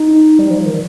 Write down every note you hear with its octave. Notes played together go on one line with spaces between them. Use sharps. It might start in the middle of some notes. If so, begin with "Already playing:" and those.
Already playing: D#4
G3
F3
D#3